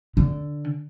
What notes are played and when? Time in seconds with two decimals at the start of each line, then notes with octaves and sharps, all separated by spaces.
0.17 D3